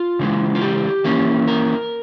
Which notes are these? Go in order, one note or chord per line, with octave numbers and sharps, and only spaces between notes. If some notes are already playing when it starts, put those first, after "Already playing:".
Already playing: F4
C#3 E3 G#3
F4
G4
E3 A#3 C#4
A#4